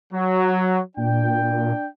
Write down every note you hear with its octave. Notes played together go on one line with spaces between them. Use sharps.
F#3
A#2 D4 G5